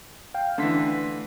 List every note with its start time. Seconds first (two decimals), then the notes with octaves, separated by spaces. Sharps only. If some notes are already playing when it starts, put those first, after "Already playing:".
0.34 F5 G5
0.58 D3 E3 A3 C6 B6